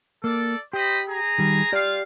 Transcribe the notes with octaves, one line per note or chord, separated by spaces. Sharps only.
A#3 A4 D5
G4 C5 D#5 B5
G#4 A#5
D#3 G3
F4 G4 D5 F5